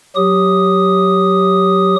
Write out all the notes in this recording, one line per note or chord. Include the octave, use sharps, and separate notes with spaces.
F#3 G4 D#6